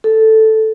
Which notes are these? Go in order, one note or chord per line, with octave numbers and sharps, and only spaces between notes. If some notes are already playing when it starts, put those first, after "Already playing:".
A4